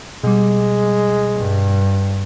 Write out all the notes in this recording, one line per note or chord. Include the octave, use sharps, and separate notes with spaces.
B2 G3 G#3
G2